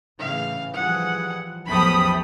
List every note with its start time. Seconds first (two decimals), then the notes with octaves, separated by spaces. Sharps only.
0.19 A2 C#3 E3 F5
0.74 E3 F3 G3 G#4 F#5
1.68 A1 E2 F3 F#3 A3 G4 B5 D#6